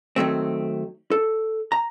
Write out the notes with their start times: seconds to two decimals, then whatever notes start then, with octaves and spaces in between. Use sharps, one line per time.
0.16 D#3 F#3 A3 C4
1.11 A4
1.72 A#5